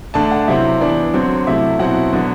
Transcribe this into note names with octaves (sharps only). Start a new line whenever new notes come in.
D3 A3 D4 A5
F#5
C3 F#3 C4 E4 E5
E3 B3 D4 D5
D3 F#3 C4
C3 F#3 A3 E4 E5
B2 F#3 C4 E4 F#5
D3 F#3 B3